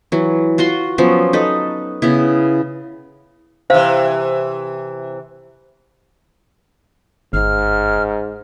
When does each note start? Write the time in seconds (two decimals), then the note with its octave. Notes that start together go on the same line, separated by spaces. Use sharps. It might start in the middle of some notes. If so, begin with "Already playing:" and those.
0.12 E3 F#3
0.58 F4 F#4 A#5 C6
0.98 F3 F#3 B3 C#4
1.33 D#4 A4 B4
2.02 C#3 B3 E4
3.70 C3 E3 C5 F5
7.33 G1 G#2 F6